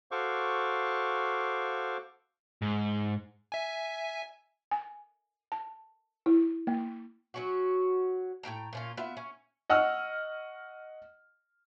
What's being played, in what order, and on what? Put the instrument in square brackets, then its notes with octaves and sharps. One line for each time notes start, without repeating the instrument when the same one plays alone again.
[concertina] F#4 A4 C5 F5 C#6 D6
[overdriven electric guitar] G#2
[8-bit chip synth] E5 G#5
[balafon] G#5
A5
E4
A#3
[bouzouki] F#3 C#4 F#4
A2 D4 G5 A#5
A#2 C#4 F4
B3 F4 E5
C#4
[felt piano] D#5 F#5 C#6 E6 F6